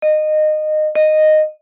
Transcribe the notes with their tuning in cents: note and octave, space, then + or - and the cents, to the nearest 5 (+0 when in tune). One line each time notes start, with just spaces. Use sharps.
D#5 -20
D#5 -10